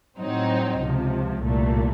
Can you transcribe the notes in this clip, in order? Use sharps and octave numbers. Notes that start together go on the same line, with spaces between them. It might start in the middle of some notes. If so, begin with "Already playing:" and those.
A2 F#3 C4 D#4
C#2 C3 F3
C2 A#2 A3